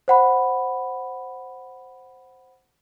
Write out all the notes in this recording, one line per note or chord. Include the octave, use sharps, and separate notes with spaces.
C5 F#5 B5